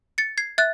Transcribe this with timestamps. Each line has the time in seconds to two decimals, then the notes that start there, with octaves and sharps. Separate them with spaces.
0.18 A6 C#7
0.38 G#6 C7
0.58 E5 F#6 A6